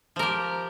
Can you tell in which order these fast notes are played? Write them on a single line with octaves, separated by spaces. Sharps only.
F3 A#4 G4